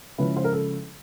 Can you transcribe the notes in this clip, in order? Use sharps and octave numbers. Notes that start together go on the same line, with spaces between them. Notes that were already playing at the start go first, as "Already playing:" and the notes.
C#3 F3 G#3 C#4 E4 B4
C5
A#4
A4